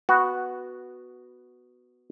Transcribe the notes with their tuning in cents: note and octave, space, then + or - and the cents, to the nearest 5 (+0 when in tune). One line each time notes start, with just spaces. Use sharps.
B3 +0 F#4 +0